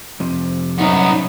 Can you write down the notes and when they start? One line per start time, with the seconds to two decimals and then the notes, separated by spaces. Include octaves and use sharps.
0.20 F2 C3
0.79 C2 F#2 F#3 B3 D#4